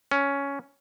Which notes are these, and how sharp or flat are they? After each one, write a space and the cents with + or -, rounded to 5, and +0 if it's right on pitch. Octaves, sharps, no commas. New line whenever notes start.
C#4 +10